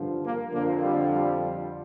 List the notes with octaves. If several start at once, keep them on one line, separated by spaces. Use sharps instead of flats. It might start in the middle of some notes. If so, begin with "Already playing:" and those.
Already playing: G2 D3 F3
A#3
F2 D3 F3 A#3
G3
G3